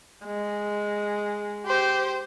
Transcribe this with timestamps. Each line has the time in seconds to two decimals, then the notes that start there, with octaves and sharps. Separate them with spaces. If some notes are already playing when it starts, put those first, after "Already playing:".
0.25 G#3
1.67 G4 C5